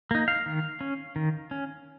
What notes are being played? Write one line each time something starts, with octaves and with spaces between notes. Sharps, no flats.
A#3 D#4
F5
D#3
C#4
D#3
C#4